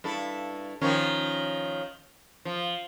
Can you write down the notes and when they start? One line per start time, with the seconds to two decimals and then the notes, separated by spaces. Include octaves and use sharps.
0.04 G2 E4 A4
0.81 D#3 F3 C#4
2.45 F3